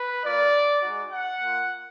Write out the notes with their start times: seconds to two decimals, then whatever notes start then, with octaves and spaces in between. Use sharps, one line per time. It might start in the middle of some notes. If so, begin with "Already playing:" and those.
Already playing: B4
0.23 A#3 F4 D5
0.82 G#3 D#4 F#4
1.11 F#5
1.40 A#3 F4